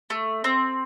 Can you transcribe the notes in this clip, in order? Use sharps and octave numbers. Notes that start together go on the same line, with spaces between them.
A3
C4